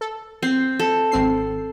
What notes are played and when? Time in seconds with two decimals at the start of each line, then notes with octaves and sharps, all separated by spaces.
0.01 A4
0.43 C4 C7
0.79 A4
1.11 G#1 C4 C7